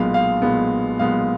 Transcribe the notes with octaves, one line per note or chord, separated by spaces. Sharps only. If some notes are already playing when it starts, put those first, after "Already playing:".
Already playing: B1 A#2 G#3 B3 F5
F5
B1 A#2 G#3 B3
B1 A#2 G#3 B3 F5